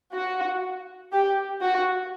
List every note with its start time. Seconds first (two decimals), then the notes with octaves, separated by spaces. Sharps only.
0.14 F#4
1.12 G4
1.62 F#4